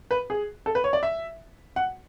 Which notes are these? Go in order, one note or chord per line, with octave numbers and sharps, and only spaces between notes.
B4
G#4
A4
B4
C#5
D5
E5
F#5